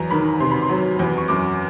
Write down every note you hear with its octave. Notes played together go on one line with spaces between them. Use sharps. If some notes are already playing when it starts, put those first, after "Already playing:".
Already playing: E2 F#3 A#5
D#3 B5
C3 C6
B5
C6
F#3
E2
C#6
F#2 D6